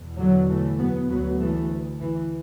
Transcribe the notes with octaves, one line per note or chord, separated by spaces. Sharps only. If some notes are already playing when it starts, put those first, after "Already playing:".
Already playing: E2 B2
D3 F#3
E3 A3
F#3 B3
D2 F#3 B3
E3 A3
E3